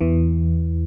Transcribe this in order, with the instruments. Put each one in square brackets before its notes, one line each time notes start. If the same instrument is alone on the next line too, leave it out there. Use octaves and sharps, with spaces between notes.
[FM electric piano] E2 E3